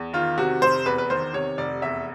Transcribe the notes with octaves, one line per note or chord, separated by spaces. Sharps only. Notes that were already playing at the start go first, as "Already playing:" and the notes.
Already playing: E2
D#3 F4
C3 F#4
F1 C5
E2 B4
B4
D#3 C5
C3 C#5
F1 D5
E2 E5